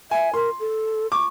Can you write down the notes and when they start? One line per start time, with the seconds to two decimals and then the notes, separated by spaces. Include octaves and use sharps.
0.11 E5 G#5
0.34 A#4 C6
0.60 A4
1.12 C#6 D6